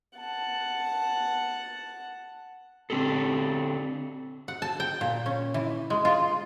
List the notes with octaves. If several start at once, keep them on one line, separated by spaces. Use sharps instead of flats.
F#5 A5
D3 C4 D4 G4 A4
F#5
A5
G5
A#2
C#4
E3
G#3
F4